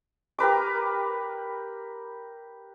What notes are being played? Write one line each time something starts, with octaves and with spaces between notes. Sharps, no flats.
G4 A#4 B4 D6